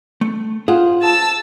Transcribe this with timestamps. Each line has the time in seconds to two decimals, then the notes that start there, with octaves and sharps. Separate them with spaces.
0.21 A3
0.68 F4 G#4 C5 F#5
1.02 A5 E6